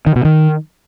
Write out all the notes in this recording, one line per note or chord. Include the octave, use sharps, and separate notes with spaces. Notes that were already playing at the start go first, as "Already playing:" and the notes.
D#3
B2
D#3